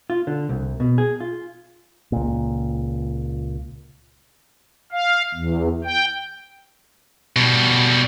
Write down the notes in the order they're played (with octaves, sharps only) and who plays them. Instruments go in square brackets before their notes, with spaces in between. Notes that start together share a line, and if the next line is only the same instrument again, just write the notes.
[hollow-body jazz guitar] F4
D3
C2
B2
G#4
F4
[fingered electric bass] C#2 A#2
[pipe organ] F5
E2
G5
[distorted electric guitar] B2 G3